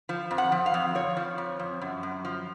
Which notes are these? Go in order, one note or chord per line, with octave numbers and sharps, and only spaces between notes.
F3
F2
F#5
F3
F5
F2
F3 C#5
F3
F2
F2
F#2
F#2
F3